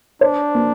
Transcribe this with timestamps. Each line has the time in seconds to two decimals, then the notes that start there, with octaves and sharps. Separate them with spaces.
0.21 D4 C5
0.55 A#3